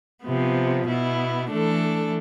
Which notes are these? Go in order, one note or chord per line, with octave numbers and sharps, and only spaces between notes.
C3 F3 B3
B2 B3 E4
E3 A3 D4 A4